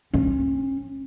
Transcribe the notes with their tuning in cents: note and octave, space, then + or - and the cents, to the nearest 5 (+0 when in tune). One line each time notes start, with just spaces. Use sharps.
C#4 -35